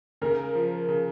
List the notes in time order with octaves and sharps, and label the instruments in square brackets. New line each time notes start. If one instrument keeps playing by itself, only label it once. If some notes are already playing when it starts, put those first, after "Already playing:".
[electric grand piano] C#3 [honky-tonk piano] A#4
[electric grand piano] F3
C#3